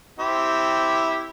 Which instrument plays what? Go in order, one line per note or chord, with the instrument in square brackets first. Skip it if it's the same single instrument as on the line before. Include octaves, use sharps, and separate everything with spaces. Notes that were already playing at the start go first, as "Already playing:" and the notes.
[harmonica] C4 E4 G4